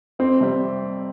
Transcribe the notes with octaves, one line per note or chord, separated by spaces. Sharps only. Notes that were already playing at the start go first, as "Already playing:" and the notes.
F2 C4
C3 G3 C4